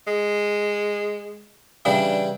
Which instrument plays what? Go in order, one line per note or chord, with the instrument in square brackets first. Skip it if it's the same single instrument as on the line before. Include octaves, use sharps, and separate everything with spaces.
[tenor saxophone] G#3
[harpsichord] C#3 E3 G3 [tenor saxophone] D4